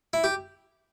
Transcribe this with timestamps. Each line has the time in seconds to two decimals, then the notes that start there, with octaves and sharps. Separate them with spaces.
0.13 E4
0.24 G4